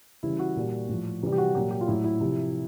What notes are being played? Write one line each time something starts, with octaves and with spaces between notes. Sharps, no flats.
C#3 E3 G3 E4
F#4
A#2 G3
A2 F3
C3 E3 G3
G4
F#4
A#2 F#3 G4
G4
F4
A2 F#3 E4
E4
C3 F3